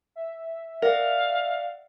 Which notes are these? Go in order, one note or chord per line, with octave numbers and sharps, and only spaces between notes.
E5
A#4 D5 F5 F#5